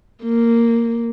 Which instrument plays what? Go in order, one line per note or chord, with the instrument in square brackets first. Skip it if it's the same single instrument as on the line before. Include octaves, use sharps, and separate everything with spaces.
[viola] A#3